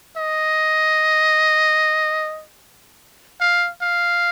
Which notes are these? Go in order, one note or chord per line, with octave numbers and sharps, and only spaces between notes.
D#5
F5
F5